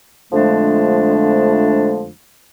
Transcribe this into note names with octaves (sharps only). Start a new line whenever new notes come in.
F2 D3 F3 G#3 A3 D4